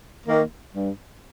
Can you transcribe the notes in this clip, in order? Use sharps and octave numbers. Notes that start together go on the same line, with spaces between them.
D#3 A#3
G2